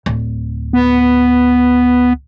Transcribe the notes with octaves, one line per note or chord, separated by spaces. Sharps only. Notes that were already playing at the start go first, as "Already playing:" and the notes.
D1
B3